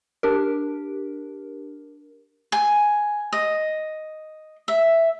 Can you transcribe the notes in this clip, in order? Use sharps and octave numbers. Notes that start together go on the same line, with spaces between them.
D4 G4 A#4
G#5
D#5
E5